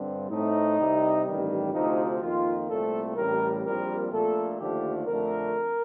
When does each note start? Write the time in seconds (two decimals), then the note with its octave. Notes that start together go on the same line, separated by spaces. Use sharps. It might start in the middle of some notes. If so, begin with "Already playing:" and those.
Already playing: G2 D3 G3 C4
0.30 A2 A3 C4 D#4
0.78 C2 C3 G3 C4
1.26 A1 G2 D#3 G3
1.73 D2 C3 F3 D#4
2.20 F2 D#3 A#3 F4
2.69 C2 A#2 A3 C4 A4
3.16 A1 A2 G3 A#4
3.64 A#1 A#2 G3 C4 A#4
4.12 A#1 A#2 A3 A4
4.59 D#2 D3 F3 A3 G4
5.07 F2 D3 A3 A#4